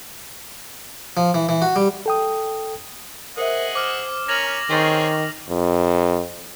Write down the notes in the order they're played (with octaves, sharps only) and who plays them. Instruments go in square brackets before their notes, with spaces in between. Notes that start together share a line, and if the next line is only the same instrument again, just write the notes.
[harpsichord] F3
E3
E3
F#4
G3
[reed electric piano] A4 G5 D#6
[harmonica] G#4 D#5 F#5 [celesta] A#4 C5 E5
[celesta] C5 [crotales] D6 F6
[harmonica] C#4 A#4 C#5 [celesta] G#6 [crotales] A#6 F7 F#7
[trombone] D#3 [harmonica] C4 G#4 C#5 [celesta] C6 C#6 A6
[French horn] F2